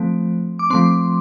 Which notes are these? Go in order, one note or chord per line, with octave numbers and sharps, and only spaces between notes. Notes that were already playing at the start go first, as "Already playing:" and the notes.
Already playing: F3 A3 C4
D6
F3 A3 C4 C6